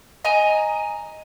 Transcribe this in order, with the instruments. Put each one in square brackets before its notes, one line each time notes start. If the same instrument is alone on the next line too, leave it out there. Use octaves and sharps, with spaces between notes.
[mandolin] D#5 G#5 A#5